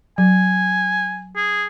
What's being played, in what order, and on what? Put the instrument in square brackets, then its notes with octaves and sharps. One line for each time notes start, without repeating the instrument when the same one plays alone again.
[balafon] F#3 [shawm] G#5
[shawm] G#4